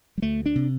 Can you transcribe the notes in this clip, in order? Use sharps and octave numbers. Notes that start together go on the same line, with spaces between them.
G3
D2 A3
D4
C3